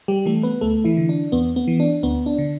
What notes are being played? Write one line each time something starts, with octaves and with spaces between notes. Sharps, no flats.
G3 G4
E3 A3 A4
B3 B4
D2 A3 A4
E3 E4
D3
D4
E2 B3
B3
E3
D4
D2 B3
D4
D3